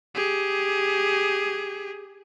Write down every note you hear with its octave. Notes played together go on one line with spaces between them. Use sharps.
G4 G#4